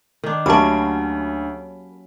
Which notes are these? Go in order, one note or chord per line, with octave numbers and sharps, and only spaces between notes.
D#3 D4
D2 F#3 A#3 C#4 G4 A#4 A5 B5